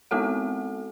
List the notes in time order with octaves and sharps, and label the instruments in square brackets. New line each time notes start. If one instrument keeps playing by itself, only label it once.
[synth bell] G#3 B3 C4 F#4 A4 F#5